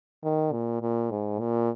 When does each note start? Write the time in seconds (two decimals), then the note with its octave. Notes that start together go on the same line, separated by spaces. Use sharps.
0.24 D#3
0.53 A#2
0.82 A#2
1.10 G#2
1.40 A#2